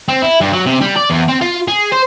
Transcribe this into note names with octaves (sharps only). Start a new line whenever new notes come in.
C4
E4
G2
F#3
C3
G3
D5
E2
C4
F4
G#4
C5